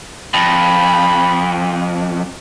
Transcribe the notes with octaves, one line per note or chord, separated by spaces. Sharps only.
F2 B5